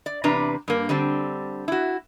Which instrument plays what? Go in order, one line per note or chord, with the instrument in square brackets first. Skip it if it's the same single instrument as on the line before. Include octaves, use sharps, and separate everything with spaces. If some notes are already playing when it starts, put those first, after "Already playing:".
[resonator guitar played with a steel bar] D5
E2 C3 D4 B4 A#5
G2 A#3
D3 G3 C4
E4 F#4